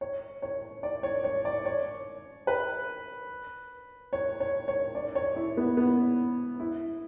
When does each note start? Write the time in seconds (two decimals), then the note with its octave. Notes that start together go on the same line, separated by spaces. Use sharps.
0.01 C#5
0.42 C#5
0.83 D5
1.03 C#5
1.24 C#5
1.45 D5
1.66 C#5
2.47 B4
4.13 C#5
4.40 C#5
4.68 C#5
4.95 D5
5.15 C#5
5.36 E4
5.57 B3
5.77 B3
6.60 E4